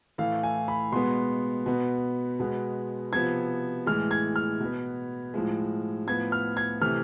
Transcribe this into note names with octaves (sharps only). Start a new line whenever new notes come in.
A2 E3 A3 F5
G#5
B5
B2 G#3 B3 C6
B2 B3
B2 G#3 B3
C3 F3 B3 G#6
A2 E3 G#3 F6
G#6
F6
B2 B3
A2 F3 G#3
A2 F3 B3 G#6
F6
G#6
C3 E3 A3 F6